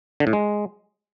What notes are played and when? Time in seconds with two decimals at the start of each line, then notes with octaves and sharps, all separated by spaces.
0.20 D3
0.27 A2
0.33 G#3